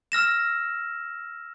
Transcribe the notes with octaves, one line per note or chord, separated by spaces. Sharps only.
E6 F6 A#6 E7